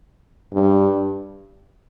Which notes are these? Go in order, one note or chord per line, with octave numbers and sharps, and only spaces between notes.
G2